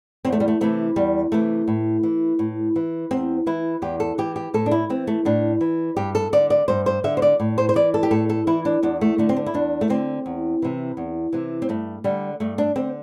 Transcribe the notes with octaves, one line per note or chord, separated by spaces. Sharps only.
E2 C4
A3
G3
A3
C3 E3 A3
E2 G3
C3 E3 A3
A2
E3
A2
E3
E2 C4
E3 E4
E2 G4
A4
E3 G4
G4
A2 A4
D4
E4
E3 C4
A3
A2 D4
E3
G2 G4
A4
D3 D5
D5
G2 C5
C5
D3 E5
C5
D5
A2
C5
C5
E3 D5
A4
G4
A2 A4
A4
E3 E4
D4
E2 D4
A3
D3 A3
C4
D4
E4
E2 D4
A3
D3 C4
E2
C3 E3
E2
C3 E3
C4
G2 A3
D3 G3
G2 A3
D4
D3 C4